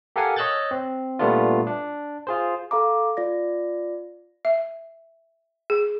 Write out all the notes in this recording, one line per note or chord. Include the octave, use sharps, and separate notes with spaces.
G4 A4 A#4 F5 F#5 G#5
C#5 D#5 E6 F#6 G6 A6
C4
A#2 G3 A3 B3 D4 F4
D4
F4 G#4 C5
A4 F5 A#5 D6
F4 D5 A#6
E5
G#4